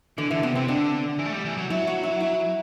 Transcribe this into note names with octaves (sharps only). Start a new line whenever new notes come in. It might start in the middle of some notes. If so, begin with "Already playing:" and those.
D3 E3
D3 E3
C3 B3
C3 C4
D3 D4
E3
A3
G3
E3
F#3
F#3 E4
F#4
E4
E4